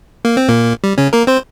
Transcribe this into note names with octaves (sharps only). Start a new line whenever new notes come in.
A#3
C4
A#2 A#3
G3
C#3 C#4
A#3 A#4
C4 C5